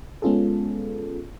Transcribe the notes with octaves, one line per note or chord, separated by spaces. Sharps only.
G#3 B3 C#4 F4 G#4 A4